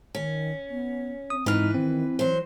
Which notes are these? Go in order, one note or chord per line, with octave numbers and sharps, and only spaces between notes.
D#3 C#4
B3
C4 D#6
G#2 E3 D#4 B4 F6
D#3 C4
E3 F#3 C5